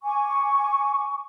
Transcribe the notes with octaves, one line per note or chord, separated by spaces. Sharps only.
G#5 C#6 D6